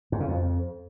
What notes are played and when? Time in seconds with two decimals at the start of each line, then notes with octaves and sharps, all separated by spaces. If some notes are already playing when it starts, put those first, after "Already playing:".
0.12 G#2
0.20 C#3
0.28 F2